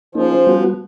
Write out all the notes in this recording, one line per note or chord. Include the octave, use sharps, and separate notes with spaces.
F3 A#3 C#4 D#4 G#4 C5
G3 B3 F#4